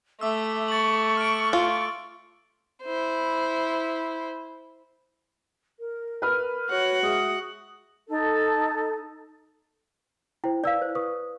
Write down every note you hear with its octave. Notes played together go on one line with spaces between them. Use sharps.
A3 E5 D6 E6
C#6 A6 F#7
F6 D7
F4
E4 C5
A#4
B4 F6
F#4 C#5 F#5
G#3 E5 D#6
D#4 A4
E4 C5 G5
E4 B4 D5 F5 E6
C5
B4 C#6 D#6